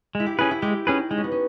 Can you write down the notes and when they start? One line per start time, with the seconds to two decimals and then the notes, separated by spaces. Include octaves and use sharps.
0.15 G#3 E4
0.26 G4
0.38 C#4 E4 G#4 B4
0.51 E4
0.62 G#3 G4
0.87 C#4 D#4 G#4 B4
1.11 G#3 D#4
1.18 C#4
1.24 B3
1.32 C#4